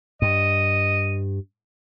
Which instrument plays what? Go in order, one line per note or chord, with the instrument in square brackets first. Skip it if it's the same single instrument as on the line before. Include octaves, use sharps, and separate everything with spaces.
[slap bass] G2 [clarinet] D#5